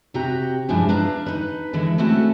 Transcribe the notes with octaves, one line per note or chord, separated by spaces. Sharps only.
C3 F#4 G4 A#5
G2 F3 G#3 D4 E4 G#5
D4 B4 E5 F5 A#5
D#4 B4
D3 E3 G#3 E4
A3 C4 C#4 E4 F#4 A4